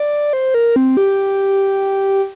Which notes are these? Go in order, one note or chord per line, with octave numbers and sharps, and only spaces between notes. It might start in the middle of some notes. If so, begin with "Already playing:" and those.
Already playing: D5
C5
A#4
C4
G4